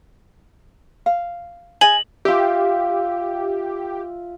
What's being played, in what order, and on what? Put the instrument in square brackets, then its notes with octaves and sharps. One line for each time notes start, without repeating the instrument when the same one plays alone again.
[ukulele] F5
[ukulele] G#4 D#5 [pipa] G#5 [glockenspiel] F#7
[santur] F4 E5 [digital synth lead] G4